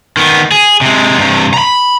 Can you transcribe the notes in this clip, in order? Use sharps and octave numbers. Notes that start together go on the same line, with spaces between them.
D#3 B3
G#4
C3 G#3
G2 C3
A#5 B5